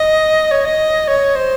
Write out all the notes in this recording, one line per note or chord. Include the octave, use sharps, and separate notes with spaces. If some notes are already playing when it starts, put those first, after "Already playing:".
Already playing: D#5
C#5
D#5
C#5
C5